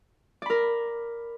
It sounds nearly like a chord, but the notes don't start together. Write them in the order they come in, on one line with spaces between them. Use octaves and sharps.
D5 B5 A#4